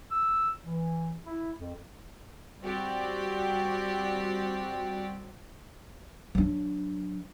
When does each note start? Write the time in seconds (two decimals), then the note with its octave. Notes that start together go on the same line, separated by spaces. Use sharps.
0.12 E6
0.63 E3
1.25 E4
1.59 F2
2.63 G3 C4 F#4 G4 D5
6.35 F#3 D4